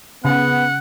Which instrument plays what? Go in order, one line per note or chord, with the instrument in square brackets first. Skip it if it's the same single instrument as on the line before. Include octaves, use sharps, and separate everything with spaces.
[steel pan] C#3 [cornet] B3 [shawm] F#5